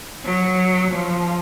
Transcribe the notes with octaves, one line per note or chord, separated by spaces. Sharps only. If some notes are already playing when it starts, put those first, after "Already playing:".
F#3
F3